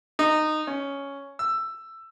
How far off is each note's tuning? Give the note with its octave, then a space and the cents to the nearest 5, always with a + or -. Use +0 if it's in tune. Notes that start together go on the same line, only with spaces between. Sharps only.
D#4 -15
C#4 +5
E6 +10